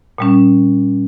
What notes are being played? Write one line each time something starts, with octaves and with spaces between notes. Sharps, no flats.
A#2 G3 C#4